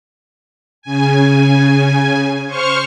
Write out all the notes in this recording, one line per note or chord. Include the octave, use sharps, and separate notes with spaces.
C#3 G#5
C5 C#6 F6